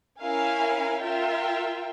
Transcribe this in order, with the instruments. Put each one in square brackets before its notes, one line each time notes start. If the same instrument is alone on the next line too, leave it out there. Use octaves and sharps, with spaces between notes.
[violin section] C#4 E4 A#4 F5 G#5
F4 A#4 E5 G5